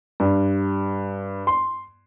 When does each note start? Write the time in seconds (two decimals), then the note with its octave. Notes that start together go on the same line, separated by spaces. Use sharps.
0.20 G2
1.47 C6